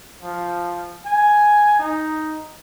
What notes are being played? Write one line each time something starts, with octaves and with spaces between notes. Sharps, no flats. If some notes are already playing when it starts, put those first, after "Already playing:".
F3
G#5
D#4